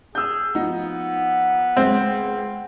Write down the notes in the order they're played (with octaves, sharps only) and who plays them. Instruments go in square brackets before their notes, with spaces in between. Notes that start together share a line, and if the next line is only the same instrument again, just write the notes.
[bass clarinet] G#4 [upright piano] E6 G6
[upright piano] F3 D#4 [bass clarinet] B3
[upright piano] C#2 [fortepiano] C4